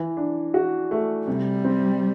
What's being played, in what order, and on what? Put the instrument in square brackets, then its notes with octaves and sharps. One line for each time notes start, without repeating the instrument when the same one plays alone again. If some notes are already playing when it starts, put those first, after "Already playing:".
Already playing: [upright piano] E3
D4
F#4
A3
[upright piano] C3 [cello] G3
[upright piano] C4